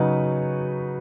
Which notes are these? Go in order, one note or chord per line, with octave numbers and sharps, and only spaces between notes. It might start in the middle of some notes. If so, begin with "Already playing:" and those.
Already playing: C#3 F#3 D#4 F#4 B4